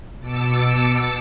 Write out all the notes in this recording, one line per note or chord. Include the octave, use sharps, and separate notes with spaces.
B2 A5 D6 E6 C#7